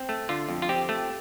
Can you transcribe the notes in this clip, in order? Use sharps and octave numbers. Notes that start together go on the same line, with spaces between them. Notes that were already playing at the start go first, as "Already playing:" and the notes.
Already playing: C4
A3
D3 F4
F2
F4
C4 G4
A3